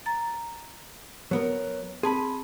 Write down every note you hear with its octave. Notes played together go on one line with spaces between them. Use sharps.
A#5 A6
F#3 B3 A#4
C4 G#4 A5 B5